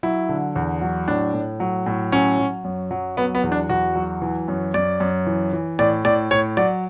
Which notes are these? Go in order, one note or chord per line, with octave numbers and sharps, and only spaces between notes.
F#3 E4
D3
E2
F#3
A2 D4
A2
F#3
A2
F#3 C#4
F#3
F#2
F#3
F#3 B3
B3
E2
D4
E2 F#4
F#3
E3
F#2
F#2 D5
F#2
E3
E3
A2 D5
A2 D5
A2 C#5
F#3 D5